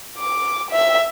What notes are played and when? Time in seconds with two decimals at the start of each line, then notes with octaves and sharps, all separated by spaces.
0.19 D6
0.71 E5